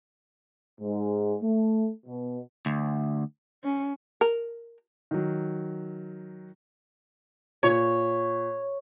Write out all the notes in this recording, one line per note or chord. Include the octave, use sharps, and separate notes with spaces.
G#2
A3
B2
D2
C#4
A#4
D#3 F#3
A#2 C#5